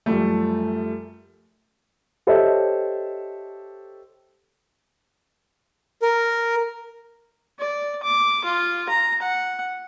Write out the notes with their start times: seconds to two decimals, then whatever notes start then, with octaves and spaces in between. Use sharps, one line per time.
0.06 F#2 F3 G3 A3
2.27 G4 A4 C5 C#5 D#5 E5
6.02 A#4
7.59 D5
8.03 D6
8.45 F4
8.89 A#5
9.22 F#5